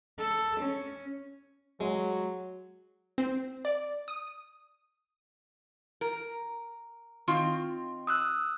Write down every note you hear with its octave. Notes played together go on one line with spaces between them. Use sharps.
A4
C#4
F#3 G#3
C4
D5
D#6
A#4
D#3 C4 F4
D#6 E6 F#6